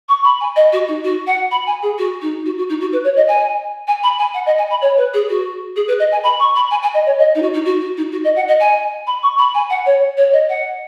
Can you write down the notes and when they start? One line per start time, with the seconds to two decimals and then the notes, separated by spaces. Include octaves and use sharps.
0.08 C#6
0.24 B5
0.40 G#5
0.56 D#5
0.72 F#4
0.88 D#4
1.04 F#4
1.27 F#5
1.51 B5
1.66 G#5
1.82 G#4
1.98 F#4
2.21 D#4
2.45 F#4
2.57 F#4
2.69 D#4
2.80 F#4
2.92 B4
3.04 C#5
3.16 D#5
3.28 G#5
3.87 G#5
4.03 B5
4.18 G#5
4.34 F#5
4.46 D#5
4.58 G#5
4.70 B5
4.81 C#5
4.97 B4
5.13 G#4
5.29 F#4
5.76 G#4
5.88 B4
5.99 D#5
6.11 G#5
6.23 B5
6.39 C#6
6.55 B5
6.70 G#5
6.82 G#5
6.94 D#5
7.06 C#5
7.18 D#5
7.35 D#4
7.42 F#4
7.53 D#4
7.65 F#4
7.81 F#4
7.97 D#4
8.12 F#4
8.24 D#5
8.36 F#5
8.48 D#5
8.60 G#5
9.07 B5
9.23 C#6
9.38 B5
9.54 G#5
9.70 F#5
9.86 C#5
10.17 C#5
10.33 D#5
10.49 F#5